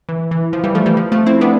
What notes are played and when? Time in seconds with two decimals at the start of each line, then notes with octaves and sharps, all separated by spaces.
0.09 E3
0.31 E3
0.53 F3
0.64 E3 G3
0.75 F3 A3
0.86 E3 G3
0.97 F3
1.12 F3 A3
1.26 C4 E4
1.41 B3 D4